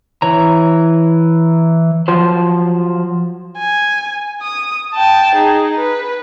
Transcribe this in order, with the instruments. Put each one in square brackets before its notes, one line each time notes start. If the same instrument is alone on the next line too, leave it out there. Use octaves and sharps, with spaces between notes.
[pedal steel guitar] E3 C#5 A#5
[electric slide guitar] F3 F#3 C5
[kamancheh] G#5
D#6
G5 A5
D#4 G#4
B4